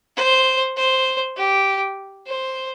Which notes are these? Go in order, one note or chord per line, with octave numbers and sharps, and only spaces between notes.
C5
C5
G4
C5